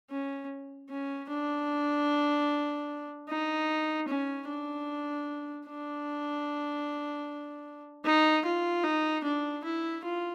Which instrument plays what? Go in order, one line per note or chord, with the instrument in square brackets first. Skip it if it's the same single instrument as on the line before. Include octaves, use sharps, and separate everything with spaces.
[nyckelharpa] C#4
C#4
D4
D#4
C#4
D4
D4
D#4
F4
D#4
D4
E4
F4